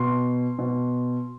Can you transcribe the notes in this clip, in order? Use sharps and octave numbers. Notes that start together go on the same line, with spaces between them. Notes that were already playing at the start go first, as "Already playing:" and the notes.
Already playing: B2 C6
B2